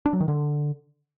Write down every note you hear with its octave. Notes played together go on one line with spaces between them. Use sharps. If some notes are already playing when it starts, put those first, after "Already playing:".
D4
F#3
D#3
D3